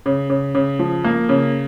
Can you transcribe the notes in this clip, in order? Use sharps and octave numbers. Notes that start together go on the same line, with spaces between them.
C#3
C#3
C#3
F3
A#3
C#3